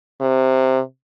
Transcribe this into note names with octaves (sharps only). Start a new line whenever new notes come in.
C3